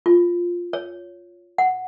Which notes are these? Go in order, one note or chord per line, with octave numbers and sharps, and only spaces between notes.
F4
C#5
F#5